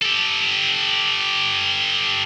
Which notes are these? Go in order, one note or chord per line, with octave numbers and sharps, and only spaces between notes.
G4 A4